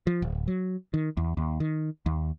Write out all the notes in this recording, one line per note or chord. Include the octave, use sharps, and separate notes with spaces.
F3
D1
F#3
D#3
E2
D#2
D#3
D#2